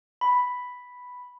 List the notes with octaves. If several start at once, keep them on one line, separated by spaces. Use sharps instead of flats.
B5